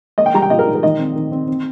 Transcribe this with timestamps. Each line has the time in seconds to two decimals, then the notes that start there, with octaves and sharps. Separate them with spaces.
0.18 A#3 D#5
0.26 G5
0.34 G3 A#5
0.42 G5
0.50 A#2 D#5
0.59 A#4
0.67 D#4
0.75 A#4
0.83 D#3 D#5
0.99 C4
1.16 D#3
1.32 C4
1.48 C4